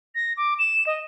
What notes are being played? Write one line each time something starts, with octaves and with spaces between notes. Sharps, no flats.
A#6
D6
E7
D#5